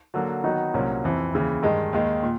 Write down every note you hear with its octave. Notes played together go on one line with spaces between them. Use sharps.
D3 F#3 A#3
D#3 F#3 B3 D#4 F#4
C2 A#2 F#3 A#3 C#4
F2 C3 E3
D#2 C#3 E3
G2 D#3 G#3
D#2 D#3 G#3
A#2